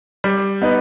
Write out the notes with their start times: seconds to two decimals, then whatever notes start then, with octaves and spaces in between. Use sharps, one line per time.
0.24 G3
0.62 B3 D#4 B4